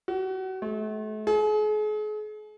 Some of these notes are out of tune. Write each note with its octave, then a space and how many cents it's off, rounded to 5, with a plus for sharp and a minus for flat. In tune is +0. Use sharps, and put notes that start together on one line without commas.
F#4 +30
A3 -40
G#4 +40